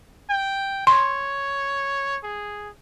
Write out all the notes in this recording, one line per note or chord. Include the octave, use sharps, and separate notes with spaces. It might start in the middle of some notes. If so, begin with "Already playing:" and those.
G5
C#5 C6
G#4